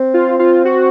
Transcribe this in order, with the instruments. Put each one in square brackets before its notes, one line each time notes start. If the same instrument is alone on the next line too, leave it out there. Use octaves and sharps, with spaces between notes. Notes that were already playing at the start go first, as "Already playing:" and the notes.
Already playing: [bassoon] C4
[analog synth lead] F4
F4
F#4